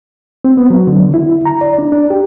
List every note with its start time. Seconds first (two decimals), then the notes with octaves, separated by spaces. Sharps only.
0.45 C4
0.57 B3
0.70 F#3
0.87 D3
1.14 E4
1.45 A#5
1.61 D5
1.79 D4
1.92 D4
2.10 G4